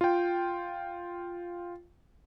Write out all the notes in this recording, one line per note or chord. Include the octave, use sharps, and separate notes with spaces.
F4 G5